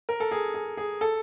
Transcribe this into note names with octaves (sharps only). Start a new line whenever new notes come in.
A#4
A4
G#4
G#4
G#4
A4